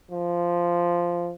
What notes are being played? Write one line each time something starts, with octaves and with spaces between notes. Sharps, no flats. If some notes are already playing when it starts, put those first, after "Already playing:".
F3